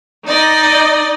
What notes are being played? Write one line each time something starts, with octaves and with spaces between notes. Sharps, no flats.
D#4 D5 D#5